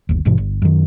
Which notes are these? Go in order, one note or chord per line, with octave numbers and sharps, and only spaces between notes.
G1 D#2
G#1 G2 B2 E3
G1
F#2 D#3